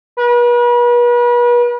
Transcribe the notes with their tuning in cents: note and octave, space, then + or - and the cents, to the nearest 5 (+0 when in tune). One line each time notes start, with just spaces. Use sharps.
B4 -40